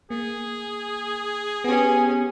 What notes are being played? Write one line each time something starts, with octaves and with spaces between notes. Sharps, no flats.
A#3 G#4
B3 C#4 G4 G#5